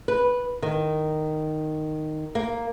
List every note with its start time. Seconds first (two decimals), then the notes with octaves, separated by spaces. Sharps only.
0.08 B4
0.62 D#3
2.35 A#3